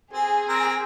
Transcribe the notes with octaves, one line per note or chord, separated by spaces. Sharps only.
C4 G#4
C4 A#4 A#5